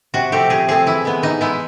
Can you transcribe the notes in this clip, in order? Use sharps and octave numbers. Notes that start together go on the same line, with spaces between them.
C3 F#4
F3 A3 C4 G4
C3 G#4
F3 A3 C4 G#4
E3 E4
G#3 B3
E3 D#4
G#3 B3 E4